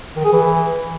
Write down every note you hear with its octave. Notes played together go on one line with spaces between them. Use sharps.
D#3
G#4
E3